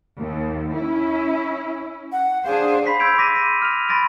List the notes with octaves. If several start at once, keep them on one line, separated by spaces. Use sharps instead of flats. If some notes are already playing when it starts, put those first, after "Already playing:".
D#2
C#4 E4
F#5
D4 G#4 C5 F5
B5 B6 C7
C6 E6 G6 G#6 D7 F7
D6 A#6 B6 D#7
D#7
F6 F7
B5 C6 A6 A#6 D7 D#7